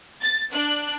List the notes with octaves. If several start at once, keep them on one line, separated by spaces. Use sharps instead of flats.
A6
D4 F#6